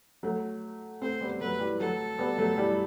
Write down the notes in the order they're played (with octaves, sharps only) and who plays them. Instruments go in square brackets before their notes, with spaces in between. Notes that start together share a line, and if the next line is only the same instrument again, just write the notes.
[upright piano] F#3 A3
[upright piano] A3 C4 [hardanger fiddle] C5
[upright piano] G3 B3
[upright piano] F#3 A3 [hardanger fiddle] B4
[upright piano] E3 G3
[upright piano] F#3 A3 [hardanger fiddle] A4
[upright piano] G3 B3
F#3 A3
E3 G3